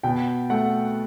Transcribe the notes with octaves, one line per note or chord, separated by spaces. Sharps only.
B2 G5
A3 F#5